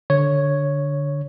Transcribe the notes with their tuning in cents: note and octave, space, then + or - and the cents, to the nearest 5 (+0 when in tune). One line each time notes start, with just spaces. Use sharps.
D3 +0 C#5 +0